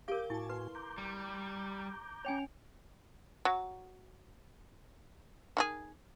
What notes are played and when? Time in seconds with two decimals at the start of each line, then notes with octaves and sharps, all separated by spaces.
0.08 G4 A#4 F5 D6 G6
0.30 A2 E4 F#4 G#5 A5 C#6
0.49 B4 C6
0.75 A#5 D6 G6
0.98 G3
2.25 C#4 C#5 G5 G#5 F7
3.45 F#3
5.57 D#3 E4 G#4